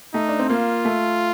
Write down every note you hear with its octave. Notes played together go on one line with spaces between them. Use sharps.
A3 D#4
D4
C4
A#3 F4
A3